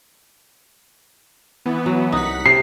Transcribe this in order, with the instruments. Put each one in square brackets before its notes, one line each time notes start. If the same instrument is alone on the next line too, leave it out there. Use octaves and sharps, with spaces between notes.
[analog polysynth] E3 B3
[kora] F#3
[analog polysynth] C2 F#5 B6 [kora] D#4
[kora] C3 [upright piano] C7